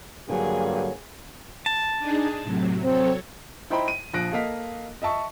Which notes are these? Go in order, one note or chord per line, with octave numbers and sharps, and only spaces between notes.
G2 D3 F#3 A#3 G#4 G#5
A5
D4 D#4 G#4
A2 C3 F#3
F#3 C4 A4 C#5
D#4 E4 C5 G5 A#5 B5
D#7
A#1 F3 F#6 A#6 D7
A#3 A4 D#5 F5 B6
D#5 E5 A5 C#6